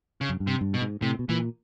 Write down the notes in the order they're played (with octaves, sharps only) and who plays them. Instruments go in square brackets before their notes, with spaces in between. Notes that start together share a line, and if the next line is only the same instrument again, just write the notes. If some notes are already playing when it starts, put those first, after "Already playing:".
[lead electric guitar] C#3
[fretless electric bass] F#2
G2
[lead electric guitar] C3
[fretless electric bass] G2
[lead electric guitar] B2
[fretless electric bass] G#2
[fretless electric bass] A2 [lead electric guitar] C3
[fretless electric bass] B2
[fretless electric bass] A#2 [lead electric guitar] E3